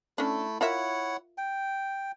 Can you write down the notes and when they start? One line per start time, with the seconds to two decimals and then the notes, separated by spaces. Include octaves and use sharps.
0.18 A3 C#4 D4 E4 A4
0.61 E4 F4 A#4 C#5 E5 F#5
1.38 G5